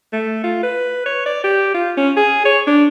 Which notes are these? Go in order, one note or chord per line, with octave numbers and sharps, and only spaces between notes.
A3
F4
B4
C#5
D5
G4
F4
C#4
G#4
C#5
D4